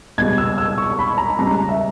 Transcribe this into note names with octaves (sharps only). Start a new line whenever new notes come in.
C#2 B2 G3 G#6
E6
E6
C#6
B5
A#5
C#2 C#3 G3 A#5
E5